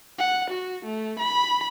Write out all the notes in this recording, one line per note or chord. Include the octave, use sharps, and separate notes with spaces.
F#5
F#4
A3
B5